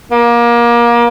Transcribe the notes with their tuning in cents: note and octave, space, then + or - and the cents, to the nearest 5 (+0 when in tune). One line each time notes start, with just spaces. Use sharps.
A#3 +25